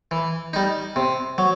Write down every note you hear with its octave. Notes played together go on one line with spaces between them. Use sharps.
E3
G3 D#4
C3
F#3